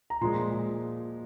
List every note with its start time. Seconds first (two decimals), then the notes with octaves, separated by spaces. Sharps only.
0.10 A#5
0.21 A#2 F3 G#3 C6